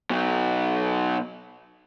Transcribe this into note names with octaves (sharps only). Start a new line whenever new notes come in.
B2 F#3